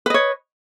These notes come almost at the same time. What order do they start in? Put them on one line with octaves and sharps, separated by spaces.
B4 D#5 C#5